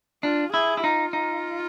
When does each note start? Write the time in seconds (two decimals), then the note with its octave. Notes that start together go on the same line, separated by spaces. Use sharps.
0.23 D4 F4
0.53 E4 G#4
0.77 E4
0.83 D#4 F4
1.13 D#4